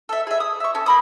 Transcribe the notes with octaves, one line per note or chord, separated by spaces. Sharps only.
A4 E5
G#4 E5
D#6
E5 C#6
C#4 A4
A#3 B5 D#6